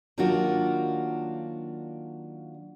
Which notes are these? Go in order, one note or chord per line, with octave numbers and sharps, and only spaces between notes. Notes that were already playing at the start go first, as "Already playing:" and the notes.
D#3 F#3 A#3 D4 F4 F#4